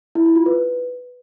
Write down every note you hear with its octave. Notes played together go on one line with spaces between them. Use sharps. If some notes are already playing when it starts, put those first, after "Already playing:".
E4
E4
F4
B4